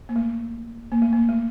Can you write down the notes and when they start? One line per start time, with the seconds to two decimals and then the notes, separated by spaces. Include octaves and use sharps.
0.09 A#3
0.16 A3
0.92 A#3
1.02 A3
1.13 A#3
1.29 A3